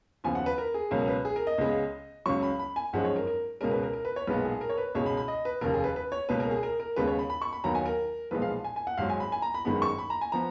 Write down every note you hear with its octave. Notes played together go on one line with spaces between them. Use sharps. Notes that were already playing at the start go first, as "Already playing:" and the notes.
D#2 C#3 F3 B3 G#5
F#5
B4
A#4
G#4
C#2 B2 F#3 C#4 A#4
B4
G#4
A#4
D#5
C#2 C#3 G#3 B3
C#2 C#3 F#3 C#6
B5
B5
G#5
G#1 F#2 F3 G#3 C#4 F#5
C#5
A#4
A#4
C#2 B2 G#3 C#4 A#4
B4
A#4
A#4
B4
C#5
B1 A#2 G#3 B3 B4
G#4
A#4
C#5
B4
C#2 B2 G#3 C#4 C#5
B5
B5
D#5
B4
F1 D#2 C#3 A#4
G#4
B4
B4
C#5
C#2 B2 A#3 C#4 B4
A#4
G#4
A#4
A#4
D#2 C#3 G#3 B3 B4
C#5
B5
B5
C#6
B5
D#2 D#3 F#3 B3 A#5
G#5
A#4
B1 A#2 F3 G#3 B3 B4
F5
G#5
G#5
F#5
G#1 G#2 F#3 F5
G#5
B5
G#5
A#5
B5
G#1 F#2 D#3 G#3 B3 B5
C#6
B5
A#5
G#5
F3 B3 A#5